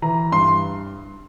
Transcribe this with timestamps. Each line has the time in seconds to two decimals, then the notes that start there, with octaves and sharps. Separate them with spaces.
0.02 E3 A#5
0.32 G2 C6